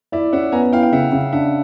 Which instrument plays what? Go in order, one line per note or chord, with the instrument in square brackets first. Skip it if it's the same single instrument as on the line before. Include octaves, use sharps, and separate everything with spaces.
[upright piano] E4 [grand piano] D5 E5
[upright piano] C#4 [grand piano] E5 F#5
[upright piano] B3 [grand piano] G#5 A#5
[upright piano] E4 [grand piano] F5 G5
[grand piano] F5 G5
[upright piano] C#3 [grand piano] E5 F#5
[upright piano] C#3
[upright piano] D4 [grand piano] E5 F#5